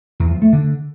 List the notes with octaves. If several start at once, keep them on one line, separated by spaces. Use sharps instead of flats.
E2
F3
A3
D3